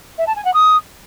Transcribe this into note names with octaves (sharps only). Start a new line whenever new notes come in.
E5
A5
G#5
F#5
D#6